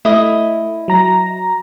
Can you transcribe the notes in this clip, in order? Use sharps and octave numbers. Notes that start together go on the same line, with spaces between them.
A3 E4 D#5
F#3 A#5 A#6